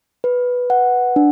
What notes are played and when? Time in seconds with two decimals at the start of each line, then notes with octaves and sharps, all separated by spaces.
0.24 B4
0.70 F#5
1.16 D4